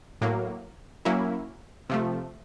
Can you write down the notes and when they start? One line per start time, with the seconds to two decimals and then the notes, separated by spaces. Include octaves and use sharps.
0.21 A2 F#3 A#3
1.05 F#3 A#3 C#4 E4
1.90 C3 F3 A3